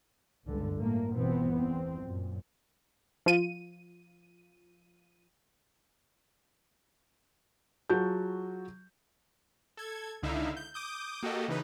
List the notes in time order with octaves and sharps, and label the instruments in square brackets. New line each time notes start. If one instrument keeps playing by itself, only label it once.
[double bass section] G1 C#2 G2 D3
G1 A2 A3 A#3
G1 B2 E3 B3 C4
E2 C4
F#2 A#2
[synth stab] F3 F4 D#7
[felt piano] F#3 F4 F#4 G#4 A5 G6
[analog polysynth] A4 G#6
C#2 D3 D#4 E4 E5 F5
G6
D6 D#6 G6
A#3 F#4 G4 A4 D#5
C#3 E3 D#4 B4